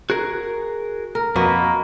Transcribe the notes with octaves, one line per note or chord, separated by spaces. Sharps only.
F#4 G#4 A#4
A#4
F2 A#3 F#4 B4 D#5